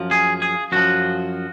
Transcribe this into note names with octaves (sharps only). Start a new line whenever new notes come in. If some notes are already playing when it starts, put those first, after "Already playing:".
Already playing: F#2 F3
G#4
G#4
F#2 F3 F#4